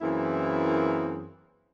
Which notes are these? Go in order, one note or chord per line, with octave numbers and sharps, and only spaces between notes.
F#2 E3 A#3 C4 E4 G#4